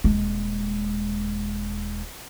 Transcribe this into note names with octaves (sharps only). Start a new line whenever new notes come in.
D#1 G#3